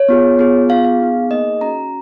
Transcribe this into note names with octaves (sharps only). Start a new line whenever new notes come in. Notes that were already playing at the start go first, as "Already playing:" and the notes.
Already playing: C#5
B3 F4 G#4
B3 F4 G#4
B3 F4 G#4 F5
F5
B3 D#4 G#4
A#3 D#4 G#4 D#5
C#4 F#4 A#5